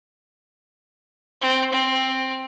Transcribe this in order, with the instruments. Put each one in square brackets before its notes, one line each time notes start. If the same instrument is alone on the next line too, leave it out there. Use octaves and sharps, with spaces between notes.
[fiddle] C4
C4